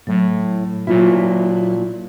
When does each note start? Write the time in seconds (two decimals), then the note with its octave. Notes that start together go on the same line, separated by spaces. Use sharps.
0.07 A2 F#3
0.87 A#2 F#3 E4 F4